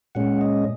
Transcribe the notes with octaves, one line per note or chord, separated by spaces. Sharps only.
A#2 G#3 C#4 F#5
D#5